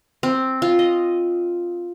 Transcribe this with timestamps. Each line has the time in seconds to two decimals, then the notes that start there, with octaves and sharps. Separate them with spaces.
0.23 C4
0.62 F4
0.79 D#5